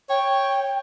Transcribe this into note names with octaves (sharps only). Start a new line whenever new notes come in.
C#5 G5